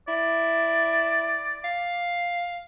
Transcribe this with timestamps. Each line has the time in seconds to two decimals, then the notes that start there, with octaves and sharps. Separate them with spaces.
0.08 E4 D5
1.64 F5